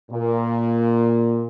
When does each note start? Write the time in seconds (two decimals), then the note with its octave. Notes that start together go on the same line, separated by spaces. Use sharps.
0.11 A#2